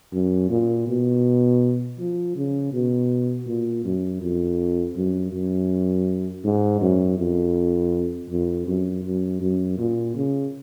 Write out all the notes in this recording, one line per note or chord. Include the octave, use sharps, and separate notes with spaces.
F#2
A#2
B2
F3
C#3
B2
A#2
F#2
F2
F#2
F#2
G#2
F#2
F2
F2
F#2
F#2
F#2
A#2
C#3